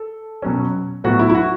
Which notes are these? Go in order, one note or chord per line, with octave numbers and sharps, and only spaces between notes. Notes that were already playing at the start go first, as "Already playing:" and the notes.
Already playing: A4
B2 F#3 C#4
A2 F#3 B3 F#4
E4
E4
F#4